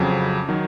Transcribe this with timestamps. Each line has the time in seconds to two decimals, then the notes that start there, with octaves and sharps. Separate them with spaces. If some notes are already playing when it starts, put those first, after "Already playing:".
Already playing: F2 C#3 F#3
0.49 D#3 F#3